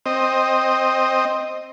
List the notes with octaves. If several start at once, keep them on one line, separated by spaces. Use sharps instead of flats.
C4 D#5